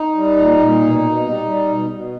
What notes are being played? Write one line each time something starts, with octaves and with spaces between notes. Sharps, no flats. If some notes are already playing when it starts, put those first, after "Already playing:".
Already playing: D#4
G3
A#2
A#2
B2
B2
G3
G3
B2
B2